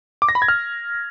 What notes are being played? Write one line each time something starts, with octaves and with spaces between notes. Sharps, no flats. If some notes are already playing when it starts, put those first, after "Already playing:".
D6
A#6
B5
G#6
F6